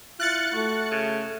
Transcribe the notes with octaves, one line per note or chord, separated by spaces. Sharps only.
E4 F4 F#6 A6 C#7
A3 F#4
C#3